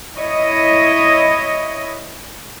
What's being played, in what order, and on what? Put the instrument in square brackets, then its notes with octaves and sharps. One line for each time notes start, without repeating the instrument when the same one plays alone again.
[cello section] E4 C#5 D#5